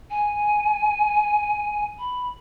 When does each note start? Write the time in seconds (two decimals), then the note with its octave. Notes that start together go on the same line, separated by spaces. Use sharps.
0.11 G#5
1.99 B5